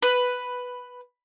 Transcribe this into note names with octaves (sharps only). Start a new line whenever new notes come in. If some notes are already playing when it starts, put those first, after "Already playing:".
B4